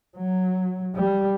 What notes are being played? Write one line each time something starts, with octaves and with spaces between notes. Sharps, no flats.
F#3
G3